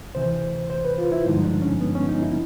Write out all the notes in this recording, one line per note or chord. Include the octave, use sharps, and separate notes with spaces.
D2 C3 E3 C5
C5
B4
F4
E4
G2 D3 F3 G#3 D#4
D4
C#4
B3
C#4
D#4
E4